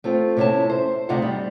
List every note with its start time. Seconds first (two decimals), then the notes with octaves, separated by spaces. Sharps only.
0.04 A3 C4 F4
0.37 C3 B3 C#4 E4 E5 A5
0.70 C5
1.09 D2 C3 D#4 F4 F5 F#5
1.22 G3